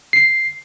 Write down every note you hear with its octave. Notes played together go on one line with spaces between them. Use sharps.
C7